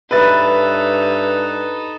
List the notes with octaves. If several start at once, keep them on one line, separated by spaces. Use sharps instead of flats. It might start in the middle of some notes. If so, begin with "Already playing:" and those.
G2 D#4 A4 B4 C#5 E5 A6